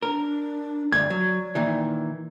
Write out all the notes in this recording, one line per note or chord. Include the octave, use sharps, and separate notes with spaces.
D4 A#4
D2 G2 D5 G#6
F#3
A#2 D#3 E3